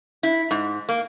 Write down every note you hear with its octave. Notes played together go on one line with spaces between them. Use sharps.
E4
G#2
A#3